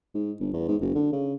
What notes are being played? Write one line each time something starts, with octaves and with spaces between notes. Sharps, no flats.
G#2
G1
E2
G#2
F#1
D3
C#3